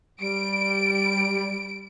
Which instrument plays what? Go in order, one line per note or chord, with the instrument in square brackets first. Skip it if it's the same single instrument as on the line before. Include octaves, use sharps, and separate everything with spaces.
[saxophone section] G3 [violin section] D7